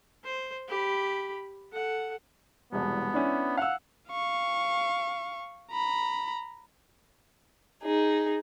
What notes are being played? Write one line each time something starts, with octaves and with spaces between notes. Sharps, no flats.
C5
G4 B5
A4 F#5
E1 C2 B3
C#4 D4 E4
F5 F#5 E6
F5 C#6
A#5 B5
D#4 G#4